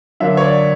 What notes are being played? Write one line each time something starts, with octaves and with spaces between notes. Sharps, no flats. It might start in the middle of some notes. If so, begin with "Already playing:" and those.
D3 F#3 A#3 E5
C#5
D5